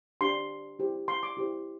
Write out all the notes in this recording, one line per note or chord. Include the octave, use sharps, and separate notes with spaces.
D4 G4 C5 C6
E4 G4 C5
C6
D6
E4 G4 C5